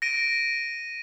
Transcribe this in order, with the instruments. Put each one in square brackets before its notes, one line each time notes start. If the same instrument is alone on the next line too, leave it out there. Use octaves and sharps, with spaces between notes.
[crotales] A#6 D7 D#7